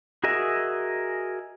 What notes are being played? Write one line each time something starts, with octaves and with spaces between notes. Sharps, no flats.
F#4 G#4 A#4 D#5 E5